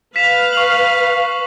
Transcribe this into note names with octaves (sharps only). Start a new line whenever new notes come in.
B4 F5 B6 E7
C#6 F#7